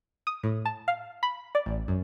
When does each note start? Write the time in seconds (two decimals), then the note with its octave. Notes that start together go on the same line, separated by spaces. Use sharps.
0.27 D#6
0.43 A2
0.65 A5
0.88 F5
1.23 B5
1.55 D5
1.66 A1
1.88 F#2